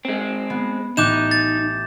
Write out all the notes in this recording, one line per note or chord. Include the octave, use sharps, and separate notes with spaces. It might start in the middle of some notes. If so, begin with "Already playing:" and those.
G#3 C4
B3
A1 D#4 A5 D6 F#6 G6 E7
A6